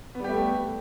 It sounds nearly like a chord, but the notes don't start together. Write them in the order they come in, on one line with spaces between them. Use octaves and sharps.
B3 G3 G4 A3